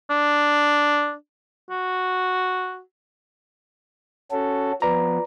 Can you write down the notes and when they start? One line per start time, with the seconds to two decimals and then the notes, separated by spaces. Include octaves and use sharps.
0.10 D4
1.70 F#4
4.31 C#4 F#4 A4
4.82 F3 B3 B4 D5 A#5